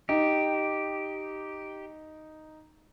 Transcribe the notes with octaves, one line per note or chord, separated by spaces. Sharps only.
D#4 G4